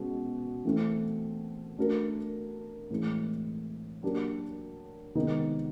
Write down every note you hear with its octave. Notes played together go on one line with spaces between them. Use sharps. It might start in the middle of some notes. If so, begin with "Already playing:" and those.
Already playing: B2 G#3 C#4
E3 A3 C4
A3 D4 F#4 A#4
A2 E3 G#3 C4
F#3 A#3 D4 G4 A#4
C3 D#3 G#3 B3 D#4